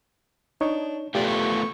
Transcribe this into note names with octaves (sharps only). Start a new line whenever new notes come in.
D4 D#4 C#5
A3 B3 F4 G4 D5
C#6